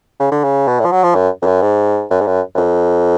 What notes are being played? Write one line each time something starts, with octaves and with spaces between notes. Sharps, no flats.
C#3
D3
C#3
B2
A2
F3
F#3
F3
F#2
F2
F#2
G#2
F#2
G#2
F#2
F#2
F2